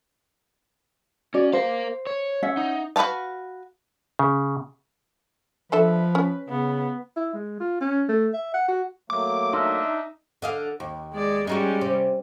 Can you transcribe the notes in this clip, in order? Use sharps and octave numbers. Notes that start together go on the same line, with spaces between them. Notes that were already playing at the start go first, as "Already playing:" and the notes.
C#4 F#4 D5
A#4 C5 F5
C#5
C#4 E5 F#5
D#4
F#4 B4 C#5 F5 A5
C#3
F3 D4 A4 B4 E5
C#4
C#3 B3
E4
G#3
F4
C#4
A3
E5
F#5
F#4
F#3 A3 A#3 D6
D4 D#4 E5 C6 E6 F6
D3 D#5 F5
D#2
G#3 D5
G3 G#3 C#4 D#4 F#4
C3